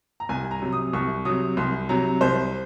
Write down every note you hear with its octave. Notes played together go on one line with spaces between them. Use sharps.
A#5
C2 G#5
A#5
C3 F#3
D#6
C2 C#6
C3 F#3 D#6
C2 C6
C3 F#3 A#5
C2 C5